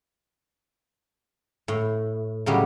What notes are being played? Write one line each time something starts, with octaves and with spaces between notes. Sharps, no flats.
A2
A2 C#3 F#3 G3